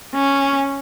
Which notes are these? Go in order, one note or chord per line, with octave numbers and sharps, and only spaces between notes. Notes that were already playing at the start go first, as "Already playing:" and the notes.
C#4